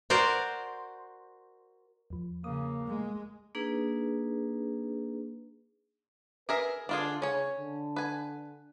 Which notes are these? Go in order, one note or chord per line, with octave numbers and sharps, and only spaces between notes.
F#4 A#4 C5 D5
E2 F3
C#3 A#3 D#6
G#3
A#3 D4 D#4 G#4 B4
G#4 A#4 B4 E5
D3 D4 F4 G#4
C#3 C#4 C#5
D3
B4 G#5